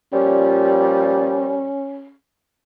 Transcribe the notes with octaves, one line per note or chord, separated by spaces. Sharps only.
A#2 F3 G3 C#4